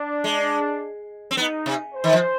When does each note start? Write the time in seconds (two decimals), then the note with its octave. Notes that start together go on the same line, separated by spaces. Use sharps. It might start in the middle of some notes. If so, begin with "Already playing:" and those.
Already playing: D4
0.24 G#3
1.31 C4
1.37 B3 D#4
1.66 C3
1.94 C5
2.04 D#3
2.13 F3